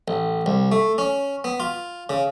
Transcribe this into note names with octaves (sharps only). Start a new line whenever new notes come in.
A1
C2
A3
C#4
B3
F4
C#3